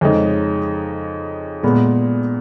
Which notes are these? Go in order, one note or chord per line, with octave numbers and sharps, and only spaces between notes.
F2 C#3 G#3 D#4
A#2 G#3 B3